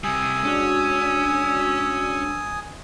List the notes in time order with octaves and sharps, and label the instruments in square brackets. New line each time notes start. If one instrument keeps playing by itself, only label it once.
[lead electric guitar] C3 G3 [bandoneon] G#5 D#6 [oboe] E6
[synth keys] G#3 D4 F#4 [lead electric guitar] C#4